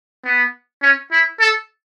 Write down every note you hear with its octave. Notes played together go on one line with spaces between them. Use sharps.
B3
C#4
E4
A4